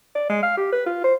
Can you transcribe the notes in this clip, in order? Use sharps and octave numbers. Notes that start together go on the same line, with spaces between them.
D5
G#3
F5
G4
B4
F4
C5